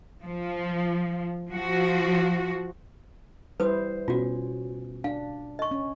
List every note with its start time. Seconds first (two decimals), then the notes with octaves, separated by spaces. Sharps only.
0.23 F3
1.51 F3 F#4
3.60 G3 E4 B4 C5 D#6
4.08 B2 C#4 F4 F#4
5.04 D4 F5
5.59 D#5 C#6
5.71 C#4